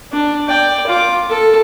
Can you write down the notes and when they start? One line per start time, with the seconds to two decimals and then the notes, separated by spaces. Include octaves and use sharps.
0.12 D4
0.48 D5 G5
0.87 F4 D6
1.30 A4